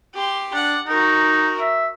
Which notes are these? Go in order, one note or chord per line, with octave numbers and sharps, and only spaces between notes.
G4 C6
D4 F#5
D#4 F#4 A#4
E5